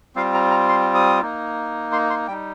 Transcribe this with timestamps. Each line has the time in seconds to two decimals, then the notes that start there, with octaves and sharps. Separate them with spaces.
0.16 G3 C4 F4 F5
0.34 A#5
0.51 A#5
0.68 C6
0.95 D#6
1.22 A#3 D#4
1.92 C6
2.10 C6
2.28 G3 G5
2.32 D#4